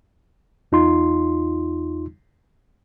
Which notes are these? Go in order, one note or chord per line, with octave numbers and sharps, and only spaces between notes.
E2 D#4 F4 C6